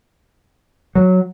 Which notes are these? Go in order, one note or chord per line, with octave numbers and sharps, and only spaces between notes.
F#3